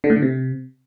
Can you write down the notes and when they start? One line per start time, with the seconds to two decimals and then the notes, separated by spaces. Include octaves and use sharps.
0.04 D3
0.10 A2
0.16 D3
0.22 C3